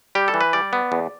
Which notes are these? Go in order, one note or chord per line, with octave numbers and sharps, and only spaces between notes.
G3 G4
A4
E3
B4
G3 D5
B3
E2